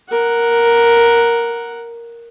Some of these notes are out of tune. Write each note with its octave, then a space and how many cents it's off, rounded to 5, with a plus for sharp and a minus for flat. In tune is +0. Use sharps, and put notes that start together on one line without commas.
A#4 +0 F#5 -5